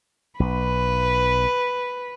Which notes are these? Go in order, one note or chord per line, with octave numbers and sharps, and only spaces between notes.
B1 B4